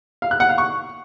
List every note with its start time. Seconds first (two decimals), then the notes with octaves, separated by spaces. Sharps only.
0.22 F5
0.31 F#6
0.40 F#5
0.49 F5
0.58 C#6